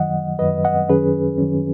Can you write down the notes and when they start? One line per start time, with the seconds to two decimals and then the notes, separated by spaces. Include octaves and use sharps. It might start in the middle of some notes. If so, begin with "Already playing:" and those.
Already playing: F#2 D#3 F#3 D#5 F#5
0.39 F#2 D#3 F#3 B4 D#5
0.65 D#5 F#5
0.88 F#2 D#3 F#3 C#4 G#4 B4
1.38 F#2 D#3 F#3 C#4